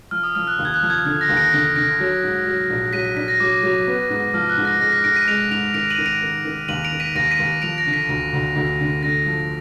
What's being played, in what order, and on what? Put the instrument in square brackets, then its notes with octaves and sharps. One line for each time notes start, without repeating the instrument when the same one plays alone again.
[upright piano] F3 [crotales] F6
[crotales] D#6
[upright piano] F3 [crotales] F6
[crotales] F#6
[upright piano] D#2
[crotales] G#6
F#6
[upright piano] F3
[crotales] G#6
[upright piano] D3 [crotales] G#6
[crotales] A#6
[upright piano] D#2
[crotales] A#6 D7
[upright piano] D3 [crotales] B6
[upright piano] D3 [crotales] A#6 D7
[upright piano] F#3
G#2
F#3
A#1
[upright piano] F#3 [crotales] B6 D#7
[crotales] B6
[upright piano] D4 [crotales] B6
[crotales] A#6
[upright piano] F#3 [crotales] D6
[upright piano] F#3
B3
G#2
[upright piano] F3 [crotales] F6
[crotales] F#6
[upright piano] G#2
[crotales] A#6
[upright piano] G#3 [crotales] A#6
[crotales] B6
[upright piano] G#2 [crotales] A#6 D7
[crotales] B6 D#7
[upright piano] G#3 [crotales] D7 F7
[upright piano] G#2 [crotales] D7 F7
[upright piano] D#3 [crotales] D7 F7
[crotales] D#7 F#7
[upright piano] D#3
[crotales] D7 F7
[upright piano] D#3
D#3
[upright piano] D#2 [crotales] D#7 F#7
[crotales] D7 F7
[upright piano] D#3
[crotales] B6 D#7
[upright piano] D#2 [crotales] A#6 D7
[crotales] B6 D#7
[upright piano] D#2
[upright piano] F3 [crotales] D7 F7
[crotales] A#6 D7
[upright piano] D3
[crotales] B6
[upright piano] D2
D2
D2
D3
[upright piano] D3 [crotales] A#6
[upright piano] F3